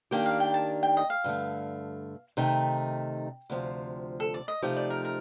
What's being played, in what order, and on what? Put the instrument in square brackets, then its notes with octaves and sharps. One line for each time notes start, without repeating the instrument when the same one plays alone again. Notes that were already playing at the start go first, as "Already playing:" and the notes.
[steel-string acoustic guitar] D#3 A#3 D4 G4 [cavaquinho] G5
[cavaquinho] F5
G5
A5
G5
D#5
F5
[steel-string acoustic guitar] G2 D3 A3
[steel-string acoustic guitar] C3 D#3 A3 D#4 [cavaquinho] G5
[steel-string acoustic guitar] D2 C3 F3
[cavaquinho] A4
D5
D#5
[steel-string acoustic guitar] C3 F3 A3 D#4 G4
[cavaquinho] D5
A#4
A#4